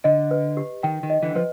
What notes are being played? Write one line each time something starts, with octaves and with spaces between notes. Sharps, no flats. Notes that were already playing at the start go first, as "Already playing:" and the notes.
D3 D#5
B4
G4
D#3 G5
D#3
D#5
D3 E3
F3 B4